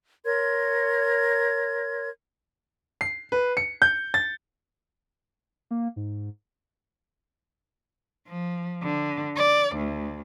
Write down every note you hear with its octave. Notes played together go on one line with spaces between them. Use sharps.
A#4 C#5 C6 G#6
C7
B4
C#7
G6
A6
A#3
G#2
F3
D3
D5
D2